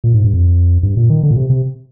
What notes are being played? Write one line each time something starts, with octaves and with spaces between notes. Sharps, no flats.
A#2
G#2
G2
F2
G2
A#2
D#3
D3
A#2
C3
C3